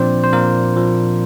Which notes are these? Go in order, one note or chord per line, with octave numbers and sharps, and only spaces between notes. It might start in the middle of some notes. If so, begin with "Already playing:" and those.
Already playing: A#2 F3 C4 D4 C5 D5
C5
A#2 A#3 A#4
F3